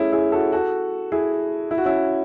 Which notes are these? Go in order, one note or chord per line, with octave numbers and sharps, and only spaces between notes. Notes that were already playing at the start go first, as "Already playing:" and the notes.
Already playing: A3 C#4 E4 G#4
E4 G#4
F#4 A4
F#4 A4
E4 G#4
E4
F#4
C#4 E4